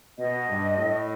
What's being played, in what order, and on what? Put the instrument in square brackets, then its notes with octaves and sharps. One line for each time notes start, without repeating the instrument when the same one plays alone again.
[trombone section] B2 [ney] D#5
[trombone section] G2
A2